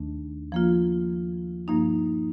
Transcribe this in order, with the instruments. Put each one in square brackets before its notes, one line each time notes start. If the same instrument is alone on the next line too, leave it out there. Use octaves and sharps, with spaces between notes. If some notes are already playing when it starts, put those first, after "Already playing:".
Already playing: [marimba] D#2 D#3 A3 D4
F3 A#3 F4
G2 F3 A#3 D#4